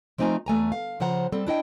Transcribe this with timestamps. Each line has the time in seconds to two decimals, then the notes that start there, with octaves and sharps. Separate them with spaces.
0.18 F3 A3 C4 D#4 G#5 A#5
0.46 E2 A3 G#5 A#5
0.72 F5
1.00 C#3 F3 C5 F#5 A#5
1.32 G3 C4 A4
1.47 D4 E4 D#5 G5